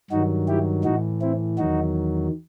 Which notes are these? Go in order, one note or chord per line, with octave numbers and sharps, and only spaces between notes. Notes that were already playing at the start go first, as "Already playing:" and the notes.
G2 D#3 F#3 D#4 F#4
E4 G4
A2 E3 D#4 F#4
C4 E4
E2 D#3 F#3 D#4 F#4